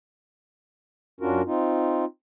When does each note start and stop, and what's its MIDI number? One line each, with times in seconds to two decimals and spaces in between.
1.21 1.42 42
1.21 1.42 61
1.21 1.42 62
1.21 1.42 65
1.21 1.42 66
1.21 1.42 70
1.46 2.05 60
1.46 2.05 63
1.46 2.05 65